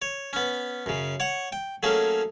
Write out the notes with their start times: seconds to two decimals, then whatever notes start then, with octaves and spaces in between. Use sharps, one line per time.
0.02 C#5
0.33 B3 C#4
0.86 F#2 C#3
1.20 C#5 F#5 C#6
1.52 G5
1.83 F#3 A3 A#3 C#4 G#4